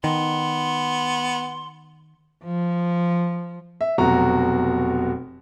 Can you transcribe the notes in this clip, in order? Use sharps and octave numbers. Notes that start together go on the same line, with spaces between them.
D#3 B3 C6
F3
E5
F1 B2 F#3 F#4 A#5